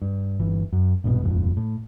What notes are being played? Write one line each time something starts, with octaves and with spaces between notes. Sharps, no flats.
G2
G1 E3
F#2
A#1 G2 B2
D#1 G#1 F2
A2